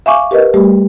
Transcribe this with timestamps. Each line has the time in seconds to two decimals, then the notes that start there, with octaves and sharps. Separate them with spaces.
0.06 E5 F5 G#5 C#6 D6
0.31 G4 A#4 B4 D#5
0.54 G3 A3 G4